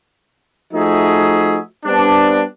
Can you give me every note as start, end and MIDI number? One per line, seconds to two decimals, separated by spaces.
0.73 1.58 53
0.73 1.58 57
0.73 1.58 63
0.73 1.58 66
0.73 1.58 68
0.73 1.58 76
1.85 2.42 55
1.85 2.42 59
1.85 2.42 60
1.85 2.42 62